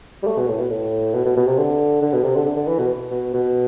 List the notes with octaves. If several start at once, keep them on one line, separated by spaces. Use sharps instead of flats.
G3
A3
B2
A2
B2
A2
B2
B2
B2
C3
D3
D3
B2
C3
D3
D3
D3
E3
B2
B2
B2